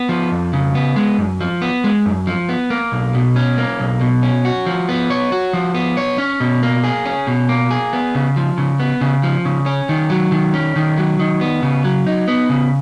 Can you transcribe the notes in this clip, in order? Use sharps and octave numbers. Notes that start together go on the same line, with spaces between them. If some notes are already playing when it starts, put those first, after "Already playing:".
Already playing: B3
F3
F2
C#3
B3
G#3
F#2
F3
B3
G#3
F#2
F3
B3
A#3
B1
B2
C#4
A#3
B1
B2
C#4
F#4
F3
B3
C#5
F#4
F3
B3
C#5
C#4
B2
A#3
G#4
C#4
B2
A#3
G#4
B3
C#3
F3
C#3
B3
C#3
F3
C#3
C#4
D#3
F#3
D#3
C#4
D#3
F#3
D#3
B3
C#3
F#3
D#4
B3
C#3